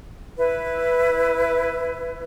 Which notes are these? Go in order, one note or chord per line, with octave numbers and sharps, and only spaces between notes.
E4 B4